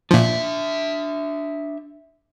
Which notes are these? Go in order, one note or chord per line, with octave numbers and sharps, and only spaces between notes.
A#2 F3 D4 E5